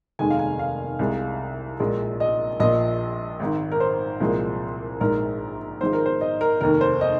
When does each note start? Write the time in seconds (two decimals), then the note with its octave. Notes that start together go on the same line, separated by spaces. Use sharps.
0.19 F1 D#2 D#3 G#3 G#5
0.31 F5
0.39 G#5
0.59 F5
0.99 C2 C3 G#3
1.80 A#1 A#2 G#3
2.20 D#5
2.60 A#1 A#2 F3 D#5
3.40 G#1 G#2 D#3
3.72 A#4
3.80 C5
4.20 C2 A#2 F3 G#3
5.00 A#1 G#2 G#3 A#4
5.81 G#1 G#2 F3 G#3 C5
5.93 A#4
6.06 C5
6.21 D#5
6.41 A#4
6.61 F1 D#2 D#3 A#4
6.81 C5
7.01 D#5